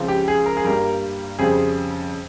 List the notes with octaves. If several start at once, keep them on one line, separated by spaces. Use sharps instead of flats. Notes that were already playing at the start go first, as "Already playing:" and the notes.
Already playing: C#2 C#3 F3 C4
G4
G#4
A#4
G#4
G2 G3 A#3 A#4
F2 C#3 G3 C4 G#4